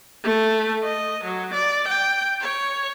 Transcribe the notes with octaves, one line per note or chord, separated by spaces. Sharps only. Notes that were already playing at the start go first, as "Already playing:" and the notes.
A3
D#5
F#3
D5
G5
C#5